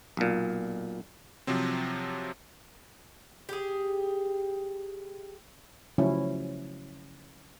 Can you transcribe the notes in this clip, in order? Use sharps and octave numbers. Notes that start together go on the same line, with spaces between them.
B1 A#2
C3 F3 F#3 C4
G4 G#4
C#3 F3 F#3 A3 C#4 E4